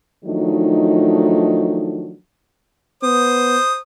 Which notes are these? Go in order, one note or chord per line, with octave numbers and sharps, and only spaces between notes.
D#3 F3 F#3 A3 D4 D#4
B3 C5 D#6